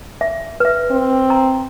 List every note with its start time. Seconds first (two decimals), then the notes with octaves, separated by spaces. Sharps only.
0.21 E5
0.60 B4 E5
0.91 C4
1.30 A#5